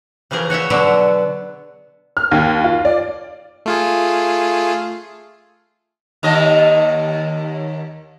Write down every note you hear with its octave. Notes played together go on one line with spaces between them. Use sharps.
C#3 E3 F3 G#4 A#4
F#4 C#5 D#5 E5
B2 D3 F#3 B3
F6
D#2
F4
D5
A3 F4 G#4
D#2 D#3 D#5